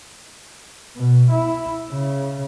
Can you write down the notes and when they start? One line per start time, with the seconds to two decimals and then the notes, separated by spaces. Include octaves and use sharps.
0.96 B2
1.31 E4
1.92 C#3